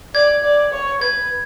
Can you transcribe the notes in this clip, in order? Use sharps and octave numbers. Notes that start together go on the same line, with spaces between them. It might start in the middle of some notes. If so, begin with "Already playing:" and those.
D5 G#6
D5
C#5
B4 G#6